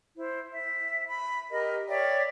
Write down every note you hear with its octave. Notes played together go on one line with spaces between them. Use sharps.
E4 C5
E5
B5
G4 A#4 D#5
C#5 D5 E5 G5